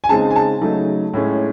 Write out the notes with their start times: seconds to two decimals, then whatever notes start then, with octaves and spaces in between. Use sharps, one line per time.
0.04 G#5
0.09 C#3 G#3 C4 D#4 A5
0.30 G#5
0.36 A5
0.61 C#3 F#3 A3 D#4
1.14 A2 G#3 C#4